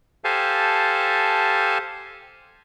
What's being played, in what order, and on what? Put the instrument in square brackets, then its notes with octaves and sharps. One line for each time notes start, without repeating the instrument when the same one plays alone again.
[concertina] G4 A4 C5 F5 G#5 A5